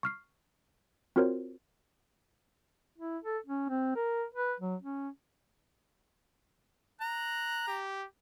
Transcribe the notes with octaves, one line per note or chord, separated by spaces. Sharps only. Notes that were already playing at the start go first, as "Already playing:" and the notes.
C#6 F6 C7
C4 F4 F#4 A#4 C5 C#5
E4
A4
C#4
C4
A#4
B4
F#3
C#4
A#5 F#6
G4